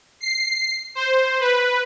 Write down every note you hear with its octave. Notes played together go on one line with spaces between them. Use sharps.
C7
C5
B4